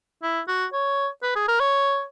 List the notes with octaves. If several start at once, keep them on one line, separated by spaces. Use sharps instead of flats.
E4
F#4
C#5
B4
G#4
A#4
C#5